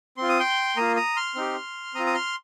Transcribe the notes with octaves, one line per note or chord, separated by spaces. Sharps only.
C4 F4 C6
D#6
G5 C6
A#3 F4 A#5 D#6
A#5 D#6
C6 F6
C4 D#4 G4
C4 F4 A#5 D#6
D#6
C6 F6